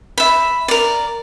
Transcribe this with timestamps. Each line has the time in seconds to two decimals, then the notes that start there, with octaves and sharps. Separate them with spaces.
0.18 E5 B5
0.68 A#4 D5